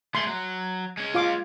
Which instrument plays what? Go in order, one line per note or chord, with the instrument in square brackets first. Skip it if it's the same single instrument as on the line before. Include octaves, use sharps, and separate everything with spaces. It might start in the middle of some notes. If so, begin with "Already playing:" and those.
[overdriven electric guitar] A3 G#4 [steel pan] C6
[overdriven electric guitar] F#3
G#3 C#4
[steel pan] F4 F5 D6